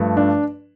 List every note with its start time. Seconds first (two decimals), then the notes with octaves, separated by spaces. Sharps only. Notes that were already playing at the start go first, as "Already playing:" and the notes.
Already playing: G2 F3 A3
0.17 D4